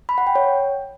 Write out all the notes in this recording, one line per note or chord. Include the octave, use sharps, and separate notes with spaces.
B5
F#5
G5
C#5